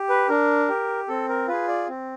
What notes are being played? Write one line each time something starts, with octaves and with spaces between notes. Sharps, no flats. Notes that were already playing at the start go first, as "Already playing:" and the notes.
Already playing: G4
B4
D4 A#4
G4
C4 A4
A#4
F4 G#4 B4
D5
C4